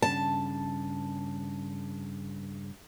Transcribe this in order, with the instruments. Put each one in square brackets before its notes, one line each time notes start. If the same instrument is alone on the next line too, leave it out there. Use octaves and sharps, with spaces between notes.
[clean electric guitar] G2 C#3 [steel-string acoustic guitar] A5